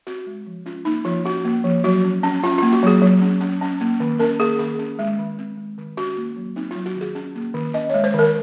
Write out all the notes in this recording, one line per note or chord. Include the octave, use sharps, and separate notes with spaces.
C4 F#4
G#3
F3
C#4 F4
A#3 D#4
F3 F4
C#4 F#4
A#3
F3
F#3 F#4
C#4
C#4
C#4 F4
A#3 F4
F#4
F#3 G#4
F#3
C#4
C#4
C#4
A#3
D#3
C#4 A#4
A#3 G#4
D#3 G#4
C#4
G#3
D#3
C4
G#3
D#3
C#4 F#4
A#3
F#3
C4 D#4
F#3 F4
F#4
D#3
G#4
C#4
A#3
D#3
C#4 D#5
G#3 C#5
C5
D#3 A#4